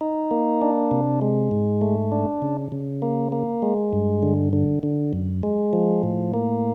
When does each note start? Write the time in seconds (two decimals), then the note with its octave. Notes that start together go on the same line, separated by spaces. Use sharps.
0.01 D#4
0.31 A#3
0.62 D4
0.91 C3
1.21 G#3
1.51 G#2
1.81 A3
2.12 D4
2.42 C#3
2.72 C#3
3.02 A#3
3.32 A#3
3.62 G#3
3.93 G2
4.23 D3
4.53 D3
4.83 D3
5.13 F#2
5.43 G#3
5.73 F3
6.03 A2
6.34 A#3